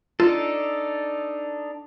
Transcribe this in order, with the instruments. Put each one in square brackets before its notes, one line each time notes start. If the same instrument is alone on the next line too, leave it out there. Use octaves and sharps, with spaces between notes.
[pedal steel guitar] D4 D#4 A4 [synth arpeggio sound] F4